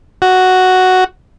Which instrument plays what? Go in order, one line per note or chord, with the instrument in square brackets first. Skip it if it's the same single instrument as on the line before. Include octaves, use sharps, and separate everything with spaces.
[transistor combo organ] F#4